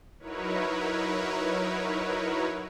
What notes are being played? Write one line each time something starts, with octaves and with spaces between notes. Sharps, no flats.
F#3 D#4 E4 A#4 B4 C#5